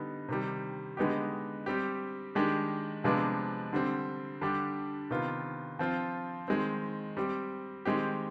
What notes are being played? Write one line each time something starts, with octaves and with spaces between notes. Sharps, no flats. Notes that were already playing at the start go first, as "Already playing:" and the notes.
Already playing: D3 G3 B3 D#4
C3 D#3 G3
D3 G#3 B3 D#4 G4
G3 C4 G4
D#3 G#3 D4 G4
C3 F3 G#3 B3 D4
D3 G3 C4
D3 G3 D4 G4
C3 D#3 B3 F4
F3 C4 F4
D#3 G#3 C4
G3 C4 G4
D#3 G#3 C4 G4